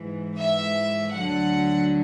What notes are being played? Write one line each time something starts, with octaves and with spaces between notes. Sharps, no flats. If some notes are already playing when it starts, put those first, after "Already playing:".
Already playing: G#2 E3
E5
D2 D3 F#3 F#5